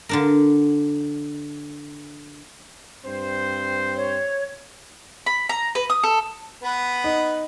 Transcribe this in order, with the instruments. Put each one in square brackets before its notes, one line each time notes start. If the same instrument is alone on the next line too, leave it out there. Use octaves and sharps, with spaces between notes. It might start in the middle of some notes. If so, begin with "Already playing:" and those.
[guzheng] D3 D4 A#4
[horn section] G2 C4 C5
[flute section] C#5
[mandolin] B5
A#5
B4
D#6
A4
[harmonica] B3 B4
[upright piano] D#4